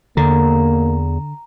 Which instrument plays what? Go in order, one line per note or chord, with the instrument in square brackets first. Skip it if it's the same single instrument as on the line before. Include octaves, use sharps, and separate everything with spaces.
[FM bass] E2 [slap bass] D3 [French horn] A#3 [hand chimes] A#5